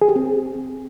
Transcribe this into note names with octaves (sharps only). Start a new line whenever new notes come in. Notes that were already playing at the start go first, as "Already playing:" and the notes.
G#4
G4
C4